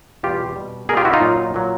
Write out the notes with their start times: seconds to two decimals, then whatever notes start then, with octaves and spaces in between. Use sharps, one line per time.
0.23 E2 B2 G3 F4 G4
0.56 B2 G3
0.89 B2 G#4 A#4
0.92 G3 F4 G4
1.05 E4 F#4
1.13 D#4 F4
1.21 A#2 F#3
1.54 A#2 F#3